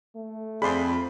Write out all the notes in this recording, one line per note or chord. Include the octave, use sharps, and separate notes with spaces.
A3
F2 G#4 D5 B5 C6